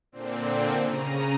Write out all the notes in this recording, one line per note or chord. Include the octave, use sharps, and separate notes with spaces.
A#2 D3 C4
C#3 A#5 D#7